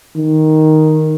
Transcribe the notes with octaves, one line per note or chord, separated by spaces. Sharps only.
D#3